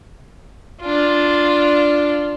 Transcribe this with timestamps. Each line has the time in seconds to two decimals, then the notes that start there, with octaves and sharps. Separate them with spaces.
0.81 D4 F4